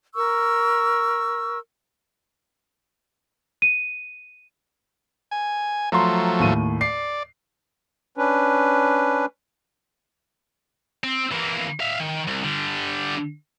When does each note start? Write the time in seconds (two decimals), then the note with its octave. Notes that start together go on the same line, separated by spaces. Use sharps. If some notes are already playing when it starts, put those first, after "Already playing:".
0.15 A#4 C#6 E6
3.62 D#7
5.31 G#5
5.92 F3 F#3 A3 A#5 C6
6.40 D#2 A2 D#7
6.81 D5 C7
8.17 C#4 D4 B4
11.04 C4
11.32 E3 A#3
11.80 E5 F5
12.00 D#3
12.27 C2
12.43 D3 G3